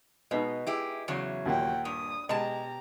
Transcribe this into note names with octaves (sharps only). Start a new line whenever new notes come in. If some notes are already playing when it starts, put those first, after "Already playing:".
B2 G#3 B3 D#4
E4 G4 G#4
E2 C#3 F#3
D#2 A#2 F#5 G5
G2 D#6
B2 G#3 G4 A5 A#5